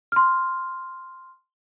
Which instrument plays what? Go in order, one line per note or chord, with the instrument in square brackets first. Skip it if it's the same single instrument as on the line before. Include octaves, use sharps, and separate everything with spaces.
[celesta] C6 F6